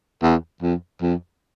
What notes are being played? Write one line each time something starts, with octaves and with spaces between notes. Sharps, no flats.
E2
F2
F2